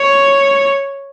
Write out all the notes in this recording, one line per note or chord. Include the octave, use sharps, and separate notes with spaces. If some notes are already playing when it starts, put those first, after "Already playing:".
Already playing: C#5